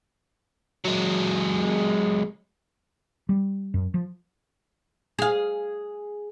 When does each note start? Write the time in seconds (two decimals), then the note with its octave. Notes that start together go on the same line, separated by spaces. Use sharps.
0.85 F#3 G#3
3.29 G3
3.74 F#2
3.94 F3
5.19 G#4 F5